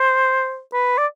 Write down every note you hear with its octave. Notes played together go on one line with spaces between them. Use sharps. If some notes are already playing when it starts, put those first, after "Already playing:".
Already playing: C5
B4
D5